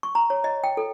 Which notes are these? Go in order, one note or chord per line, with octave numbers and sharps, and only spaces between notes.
C#6
A#5
C#5
D#5
G5
A4